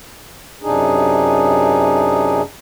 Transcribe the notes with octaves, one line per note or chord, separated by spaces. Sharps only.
F#2 C3 D4 D#4 G#4